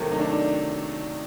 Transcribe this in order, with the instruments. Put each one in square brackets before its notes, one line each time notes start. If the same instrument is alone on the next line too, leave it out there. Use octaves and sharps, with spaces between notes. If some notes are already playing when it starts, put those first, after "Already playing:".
Already playing: [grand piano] C3 D#3 F#3 A3
[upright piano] D#4
D4